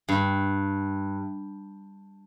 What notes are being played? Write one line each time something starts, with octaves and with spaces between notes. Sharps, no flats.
G2